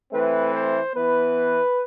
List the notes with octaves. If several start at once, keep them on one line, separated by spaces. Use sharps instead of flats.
E3 A3 C4 B4
C5
E3 B3 B4